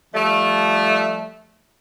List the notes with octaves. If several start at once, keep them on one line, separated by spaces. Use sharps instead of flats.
F3 G3 A3